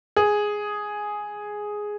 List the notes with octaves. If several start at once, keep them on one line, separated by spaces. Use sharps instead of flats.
G#4